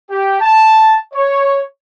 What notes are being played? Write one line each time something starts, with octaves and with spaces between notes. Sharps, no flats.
G4
A5
C#5